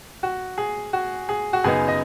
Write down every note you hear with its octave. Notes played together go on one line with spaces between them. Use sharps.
F#4
G#4
F#4
G#4
F#4
F#2 C#3 B3 D#4 G#4
D#5